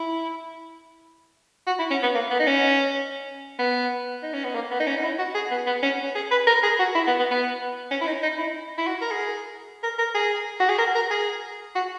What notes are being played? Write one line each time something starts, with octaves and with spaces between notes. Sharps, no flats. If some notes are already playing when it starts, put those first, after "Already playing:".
Already playing: E4
F#4
E4
C#4
B3
A#3
B3
D#4
C#4
B3
D#4
C#4
B3
A#3
B3
D#4
C#4
D#4
E4
F#4
G#4
B3
B3
C#4
G#4
B4
A#4
G#4
F#4
E4
B3
B3
B3
C#4
E4
D#4
D#4
E4
E4
F#4
A#4
G#4
A#4
A#4
G#4
F#4
G#4
A#4
A#4
G#4
F#4